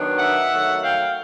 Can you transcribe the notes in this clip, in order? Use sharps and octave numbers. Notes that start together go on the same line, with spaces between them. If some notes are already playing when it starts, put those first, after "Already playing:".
Already playing: D#3 F#3 B3 D4
E5 F#5
D#3 F#3 A3
F5 G5